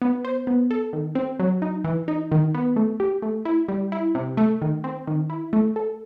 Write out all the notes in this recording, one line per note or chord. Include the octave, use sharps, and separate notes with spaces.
B3
C5
B3
A4
D#3
C4
F#3
D#4
E3
D#4
D#3
B3
A3
G4
A3
E4
G3
E4
C3
A3
D#3
C4
D#3
E4
A3
A4